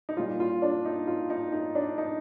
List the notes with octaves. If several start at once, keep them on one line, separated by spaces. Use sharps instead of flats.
D#4
A#2 G3 F4
F4
D4
D#4
F4
D#4
D#4
D4
D#4